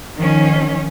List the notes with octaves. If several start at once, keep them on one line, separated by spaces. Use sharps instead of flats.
D#3 F3 C#4